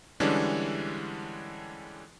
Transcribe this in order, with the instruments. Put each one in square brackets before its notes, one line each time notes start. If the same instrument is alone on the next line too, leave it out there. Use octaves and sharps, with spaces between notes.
[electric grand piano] D3 E3 G3 G#3 C#4 D4